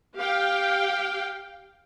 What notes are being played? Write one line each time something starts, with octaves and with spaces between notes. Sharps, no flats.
G4 F5 G5